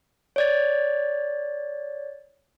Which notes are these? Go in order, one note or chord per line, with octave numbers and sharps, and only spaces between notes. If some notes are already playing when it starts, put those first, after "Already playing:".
C#5 D5 A6